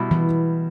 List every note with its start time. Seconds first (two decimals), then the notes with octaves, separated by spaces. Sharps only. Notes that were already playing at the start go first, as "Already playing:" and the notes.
Already playing: B2 G3 E4
0.11 E3